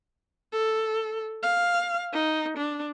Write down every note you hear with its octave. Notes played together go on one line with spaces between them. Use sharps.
A4
F5
D#4
D4